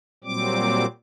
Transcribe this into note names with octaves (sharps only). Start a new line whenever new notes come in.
A#2 F#3 G3 C4 D6